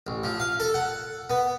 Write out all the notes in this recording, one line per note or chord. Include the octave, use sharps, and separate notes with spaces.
A1
F3
F5
A4
F#5
B3